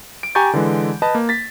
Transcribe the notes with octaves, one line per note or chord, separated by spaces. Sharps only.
D7
G4 G#5 A#5 C#6 G6 A6
D3 E3 G#3
B4 D#5 A5 B5
A#3
A6 B6